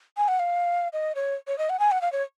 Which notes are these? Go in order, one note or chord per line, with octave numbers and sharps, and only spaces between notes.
G#5
F#5
F5
D#5
C#5
C#5
D#5
F#5
G#5
F#5
F5
C#5